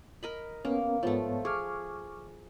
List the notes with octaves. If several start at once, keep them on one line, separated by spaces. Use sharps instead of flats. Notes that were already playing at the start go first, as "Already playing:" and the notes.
A#4 D#5 B5
A#3 B3 C#4 A#4
G#2 F3 A3 B3 C#5
G#4 C#6 D6 F6